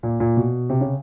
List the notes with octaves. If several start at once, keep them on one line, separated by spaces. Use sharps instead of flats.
A#2
A#2
B2
C3
C#3